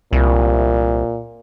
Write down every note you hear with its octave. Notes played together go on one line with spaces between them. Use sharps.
C2 A#2